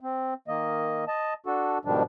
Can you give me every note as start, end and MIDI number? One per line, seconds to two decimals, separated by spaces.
0.01 0.34 60
0.48 1.05 51
0.48 1.05 58
0.48 1.05 75
1.08 1.34 75
1.08 1.34 81
1.46 1.78 62
1.46 1.78 66
1.46 1.78 69
1.85 2.03 44
1.85 2.03 47
1.85 2.03 51
1.85 2.03 53
1.85 2.03 55
1.85 2.03 62